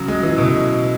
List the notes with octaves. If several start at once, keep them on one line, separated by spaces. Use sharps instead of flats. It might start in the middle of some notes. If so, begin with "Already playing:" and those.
Already playing: C#3 F#3
G#3
E3
B2